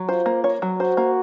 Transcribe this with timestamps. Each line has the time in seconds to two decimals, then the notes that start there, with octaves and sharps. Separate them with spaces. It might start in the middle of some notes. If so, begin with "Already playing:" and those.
Already playing: F#3
0.08 F4 C5
0.26 A#3
0.44 C#5
0.62 F#3
0.79 F#4 C5
0.97 A#3